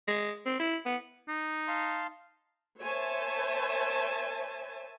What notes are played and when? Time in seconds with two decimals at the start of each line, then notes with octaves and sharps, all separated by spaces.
0.08 G#3
0.46 C4
0.60 E4
0.86 B3
1.28 D#4
1.68 F5 A5 C6
2.80 A#4 C5 C#5 E5 G#5 A5